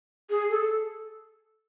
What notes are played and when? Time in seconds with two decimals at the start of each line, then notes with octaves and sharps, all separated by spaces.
0.30 G#4
0.50 A4